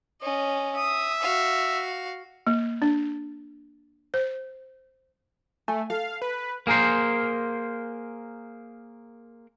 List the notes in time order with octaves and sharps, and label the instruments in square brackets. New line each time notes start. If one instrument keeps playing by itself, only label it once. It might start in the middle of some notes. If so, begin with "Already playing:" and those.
[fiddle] C#4 D#5
[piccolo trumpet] E5 [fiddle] D#6
[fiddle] F#4 F5
[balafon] A#3
D4
C5
[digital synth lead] A3 [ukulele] G#5
[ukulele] A4 [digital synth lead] F5
[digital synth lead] B4
[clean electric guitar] A#3 G#4 A#4 C5